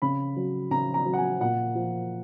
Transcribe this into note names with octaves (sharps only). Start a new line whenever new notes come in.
C#3 B5
F#3
C#3 A#5
A#5
F#3
F#5
G#5
A#2 F#5
F3